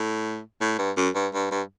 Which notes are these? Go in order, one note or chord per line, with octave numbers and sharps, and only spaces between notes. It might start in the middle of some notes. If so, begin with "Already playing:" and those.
Already playing: A2
A2
G2
F#2
G2
G2
G2